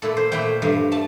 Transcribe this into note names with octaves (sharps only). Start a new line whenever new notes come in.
A#2 A3 E4 A4
C5
A#2 A3 E4 G5
G2 F3 A3
A3 A5